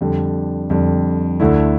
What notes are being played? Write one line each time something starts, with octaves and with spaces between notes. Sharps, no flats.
F2 D3 G3
F2 D3 G3
D2 D3 A3 E4